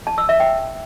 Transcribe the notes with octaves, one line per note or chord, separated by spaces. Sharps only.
A5
E6
E5
G5